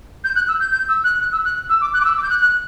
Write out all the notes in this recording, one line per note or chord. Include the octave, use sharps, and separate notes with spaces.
G6
F#6
E6
G6
G6
E6
F#6
F#6
E6
F#6
E6
D6
F#6
D6
E6
D6
G6
F#6
F#6